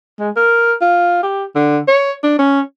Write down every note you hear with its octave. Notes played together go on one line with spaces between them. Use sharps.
G#3
A#4
F4
G4
D3
C#5
D4
C#4